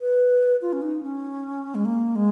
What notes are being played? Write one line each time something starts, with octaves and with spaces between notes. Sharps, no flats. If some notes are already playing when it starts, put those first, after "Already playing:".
B4
F4
C#4
D#4
C#4
G#3
A#3
G#3